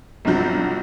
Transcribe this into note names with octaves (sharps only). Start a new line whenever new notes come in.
B1 G2 C3 F3 F#3 G6